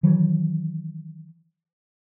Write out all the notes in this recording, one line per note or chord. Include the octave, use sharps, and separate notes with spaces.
D#3 E3 F#3